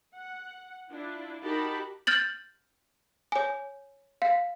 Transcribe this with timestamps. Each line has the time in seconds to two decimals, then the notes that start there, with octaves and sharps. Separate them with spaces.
0.15 F#5
0.90 D4 E4 F4
1.43 D#4 F#4 G4 A#4 A5 B5
2.07 F6 G6 A6 F#7
3.32 C#5 G#5
4.22 F5